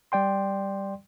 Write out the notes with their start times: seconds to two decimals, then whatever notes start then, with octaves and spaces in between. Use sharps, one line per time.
0.12 G3 D5 G5 C6